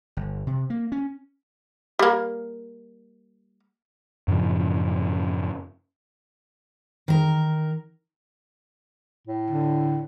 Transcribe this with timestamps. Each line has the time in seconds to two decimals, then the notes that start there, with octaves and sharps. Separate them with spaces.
0.17 G1
0.47 C3
0.70 A#3
0.92 C#4
1.99 G3 A#3
4.28 F#2 A2 C#3 F3
7.08 D#3 A#4
9.27 A2
9.51 D3